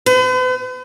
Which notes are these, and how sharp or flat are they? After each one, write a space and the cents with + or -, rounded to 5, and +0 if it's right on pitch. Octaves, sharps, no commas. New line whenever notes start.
B4 +45